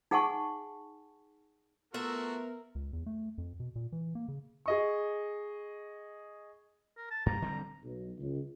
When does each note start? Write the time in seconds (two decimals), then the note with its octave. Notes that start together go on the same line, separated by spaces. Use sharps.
0.11 D#4 G#4 F#5 G#5 A5 C#6
1.94 A3 B3 F4 F#4 A#4 E5
2.75 C#2
2.93 E2
3.06 A3
3.38 F2
3.60 B2
3.76 A#2
3.92 E3
4.15 A#3
4.28 C#3
4.66 G#4 D#5 C#6
6.97 A#4
7.11 A5
7.26 G2 G3 A#3 A#5
7.42 D3 G3 C4
7.83 B1
8.18 C#2